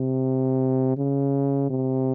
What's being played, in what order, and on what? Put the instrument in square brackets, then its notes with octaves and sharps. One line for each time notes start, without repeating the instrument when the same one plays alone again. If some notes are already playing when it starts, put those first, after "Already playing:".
Already playing: [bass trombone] C3
C#3
C3